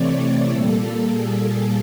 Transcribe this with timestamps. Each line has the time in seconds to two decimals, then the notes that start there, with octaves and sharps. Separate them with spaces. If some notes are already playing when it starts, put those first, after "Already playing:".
Already playing: C3 E3 A3 C4 C#5 D5
0.50 A#2 G3 A#3 A4
1.08 G#4